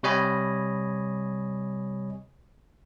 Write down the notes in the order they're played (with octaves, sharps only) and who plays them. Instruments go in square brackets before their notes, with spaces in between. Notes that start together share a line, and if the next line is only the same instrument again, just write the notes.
[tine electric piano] C3 G3 C#5 D#5 G#5 B5